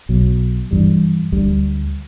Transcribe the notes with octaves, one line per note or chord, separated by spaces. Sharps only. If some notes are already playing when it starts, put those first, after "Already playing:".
B1 B2 F#3
G2 E3 G3
D2 D3 G3